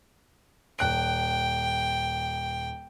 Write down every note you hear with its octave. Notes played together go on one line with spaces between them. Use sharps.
D#1 G5 F#6 D7